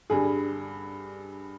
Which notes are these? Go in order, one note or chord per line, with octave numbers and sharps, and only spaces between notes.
G2 D3 G3 G#4